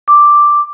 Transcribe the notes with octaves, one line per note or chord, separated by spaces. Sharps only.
D6